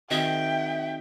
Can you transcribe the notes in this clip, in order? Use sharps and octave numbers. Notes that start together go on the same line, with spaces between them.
D#3 C4 F#4 G#4 D#5 E5 G5